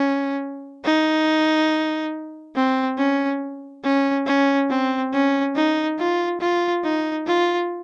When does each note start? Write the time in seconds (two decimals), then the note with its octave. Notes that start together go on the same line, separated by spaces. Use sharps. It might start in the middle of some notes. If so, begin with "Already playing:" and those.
Already playing: C#4
0.84 D#4
2.56 C4
2.98 C#4
3.84 C#4
4.26 C#4
4.69 C4
5.13 C#4
5.55 D#4
5.98 F4
6.40 F4
6.84 D#4
7.26 F4